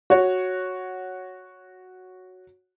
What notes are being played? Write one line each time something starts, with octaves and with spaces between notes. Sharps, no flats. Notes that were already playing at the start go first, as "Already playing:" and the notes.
F#4 C#5